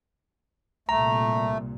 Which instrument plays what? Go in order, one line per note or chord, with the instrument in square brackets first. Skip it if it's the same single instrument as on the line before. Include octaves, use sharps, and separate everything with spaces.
[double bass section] C2 A#2 [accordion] A3 [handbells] A#5